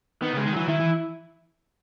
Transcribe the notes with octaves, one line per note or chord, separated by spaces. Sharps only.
D#3 B3
C#3 G#3
D#3
E3 F#3
D#3 E4
E3